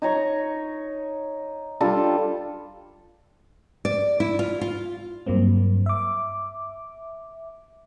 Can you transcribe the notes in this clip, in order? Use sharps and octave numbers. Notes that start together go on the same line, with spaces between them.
D#4 C#5 A#5 C#6
G3 D4 F4 A4
D5
E4
F4
F4
G2 F#3 A#3 C4
E5 D6